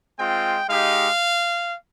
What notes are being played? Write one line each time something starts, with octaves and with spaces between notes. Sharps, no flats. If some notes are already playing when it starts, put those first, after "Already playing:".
G#3 C4 F4 G5
G#3 D#4 G4 F5